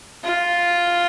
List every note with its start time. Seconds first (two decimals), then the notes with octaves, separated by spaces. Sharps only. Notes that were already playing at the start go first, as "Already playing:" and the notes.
0.24 F4